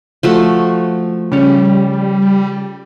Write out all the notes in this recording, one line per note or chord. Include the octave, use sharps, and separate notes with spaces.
F3 A3 F#4
C#3 G3 C#4